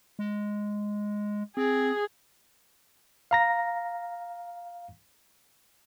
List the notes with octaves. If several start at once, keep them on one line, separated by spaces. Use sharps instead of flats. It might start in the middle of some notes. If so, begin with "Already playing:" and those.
G#3
C4 G#4
F5 A#5 A#6